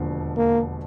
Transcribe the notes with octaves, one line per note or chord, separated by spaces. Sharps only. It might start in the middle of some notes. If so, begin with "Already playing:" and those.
Already playing: E1 D#2 D3 F3
A#3